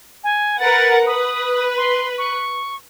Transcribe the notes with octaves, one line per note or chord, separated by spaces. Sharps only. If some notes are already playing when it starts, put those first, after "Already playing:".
G#5
A#4 B4 F#5 A6
B4 D#6
C6
C#6